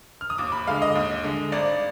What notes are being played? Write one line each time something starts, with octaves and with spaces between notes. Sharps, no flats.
F6
D#6
D#2 D6
B5
D3 G#3 F5
D#5
D#2
D3 G#3
G#1 D5